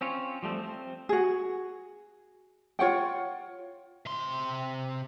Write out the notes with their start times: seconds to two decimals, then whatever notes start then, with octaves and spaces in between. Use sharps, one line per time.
0.01 C4 C#4 F4 C#5
0.43 F3 G3 A3 C4
0.64 C4
1.09 F#4 G#4
2.79 F4 C#5 F#5 G5
4.06 C3 C6